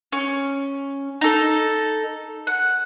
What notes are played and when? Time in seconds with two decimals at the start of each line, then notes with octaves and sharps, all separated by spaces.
0.12 C#4
1.21 D#4 A4
2.47 F#5